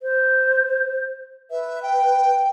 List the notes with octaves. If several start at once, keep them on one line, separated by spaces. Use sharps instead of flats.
C5
B4 E5
G5